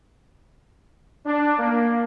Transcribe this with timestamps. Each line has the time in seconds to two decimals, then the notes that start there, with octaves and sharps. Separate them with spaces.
1.26 D4
1.59 A#3